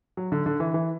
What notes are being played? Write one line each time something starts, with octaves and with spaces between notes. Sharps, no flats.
F#3
D3
D3
E3
E3